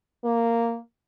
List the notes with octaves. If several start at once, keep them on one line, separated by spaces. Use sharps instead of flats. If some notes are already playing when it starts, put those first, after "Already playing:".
A#3